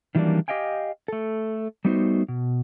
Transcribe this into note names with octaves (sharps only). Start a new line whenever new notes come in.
D#3 E3 F#3 G3 A#3 D4
G4 D#5 F5 G5 G#5
A3 A4
G3 A3 B3 D#4 F#4 C5
B2